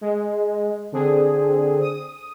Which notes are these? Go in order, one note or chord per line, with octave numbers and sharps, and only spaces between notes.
G#3
D3 C4 G#4
D#6